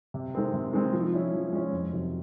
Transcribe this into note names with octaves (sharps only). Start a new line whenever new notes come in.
C3
D#3 G#3 C4
C3
D#3 G#3 C4
F3
G#3 C#4 E4
F3
G#3 C#4 E4
F2
C3 D#3 F#3